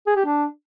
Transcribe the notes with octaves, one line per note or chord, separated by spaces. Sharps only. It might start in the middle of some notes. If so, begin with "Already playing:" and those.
G#4
G4
D4